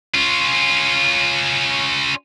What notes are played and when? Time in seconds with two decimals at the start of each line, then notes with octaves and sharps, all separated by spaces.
0.14 C#4 F4